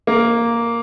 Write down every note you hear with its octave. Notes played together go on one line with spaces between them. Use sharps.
A#3